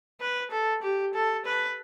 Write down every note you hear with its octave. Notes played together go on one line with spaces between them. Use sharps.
B4
A4
G4
A4
B4